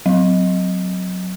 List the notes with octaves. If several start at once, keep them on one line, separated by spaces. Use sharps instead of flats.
F#3